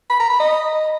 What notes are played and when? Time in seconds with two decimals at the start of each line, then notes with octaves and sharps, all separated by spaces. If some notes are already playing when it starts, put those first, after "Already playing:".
0.10 B5
0.20 A#5
0.30 B5
0.40 D#5